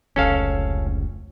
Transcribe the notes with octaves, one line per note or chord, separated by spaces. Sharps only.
F1 C#2 C#4 A4 F5